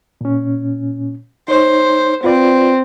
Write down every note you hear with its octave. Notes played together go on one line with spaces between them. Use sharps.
A#2 C#4
D#4 C5 C#5
C4 F4 B4 D5